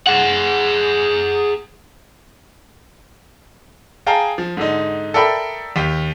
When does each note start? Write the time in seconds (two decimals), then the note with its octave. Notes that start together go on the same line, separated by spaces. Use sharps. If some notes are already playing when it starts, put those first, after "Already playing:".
0.07 G#4 F#5
4.06 G#4 F5 G5 A5 A#5
4.38 F3
4.57 G#2 D3 D#4
5.14 A4 A#4 D5 E5 G5 B5
5.76 D#2 G4 B6